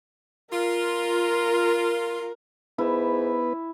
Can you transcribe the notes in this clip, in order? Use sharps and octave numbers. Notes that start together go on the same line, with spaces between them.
F4 A#4
G#2 B3 E4 B4